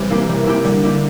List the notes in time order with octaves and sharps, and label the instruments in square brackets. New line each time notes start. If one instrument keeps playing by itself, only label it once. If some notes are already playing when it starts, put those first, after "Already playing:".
Already playing: [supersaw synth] C3 E3 [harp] G3
[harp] A#3 E4 G4
G3
A#3 E4 G4
[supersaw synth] D3 [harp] G3
[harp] A#3 E4 G4